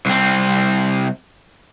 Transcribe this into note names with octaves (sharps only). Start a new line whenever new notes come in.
C2 C4